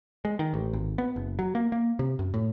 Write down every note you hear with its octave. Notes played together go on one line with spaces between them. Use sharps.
G#3
D#3
A1
G#1
B3
F#1
F#3
A#3
A#3
C3
F#2
A2